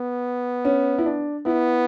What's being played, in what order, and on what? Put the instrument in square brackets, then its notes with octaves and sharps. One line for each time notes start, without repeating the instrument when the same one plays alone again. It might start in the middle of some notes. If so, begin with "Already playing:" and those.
Already playing: [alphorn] B3
[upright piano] C#4
E4
D4
[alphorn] B3 [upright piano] E4